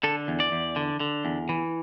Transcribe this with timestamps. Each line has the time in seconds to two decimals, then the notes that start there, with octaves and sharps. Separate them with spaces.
0.03 D3 A4
0.28 E2
0.40 D5
0.52 E2
0.76 D3
1.00 D3
1.25 E2
1.49 E3